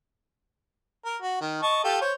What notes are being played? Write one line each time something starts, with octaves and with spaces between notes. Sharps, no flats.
A#4
F#4
D#3
D#5 A5 C#6
F4 G4 A4
C5 C#5